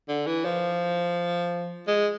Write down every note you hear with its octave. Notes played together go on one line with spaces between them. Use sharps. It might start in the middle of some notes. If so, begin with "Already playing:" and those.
D3
E3
F3
G#3